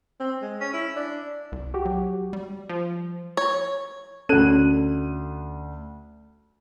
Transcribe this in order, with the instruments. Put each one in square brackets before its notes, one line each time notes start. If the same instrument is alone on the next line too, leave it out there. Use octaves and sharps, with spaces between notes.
[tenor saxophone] C4
G#3
C#4
E4
D4
[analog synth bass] C2
[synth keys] F#4 G4
[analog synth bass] F#3
G3
[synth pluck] F3
[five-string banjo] C#5
[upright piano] D2 D#7 [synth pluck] C#4 A4 F#6